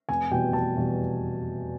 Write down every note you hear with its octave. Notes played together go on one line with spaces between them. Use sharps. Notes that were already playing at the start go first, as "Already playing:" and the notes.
F1 G#5
E2 B2 G3 G5
F1 A5
E2 B2 G3